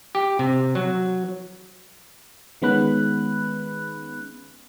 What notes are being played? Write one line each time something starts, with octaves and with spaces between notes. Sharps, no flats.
G4
C3
F#3
D#3 G#3 B3 C#4 B5 F#6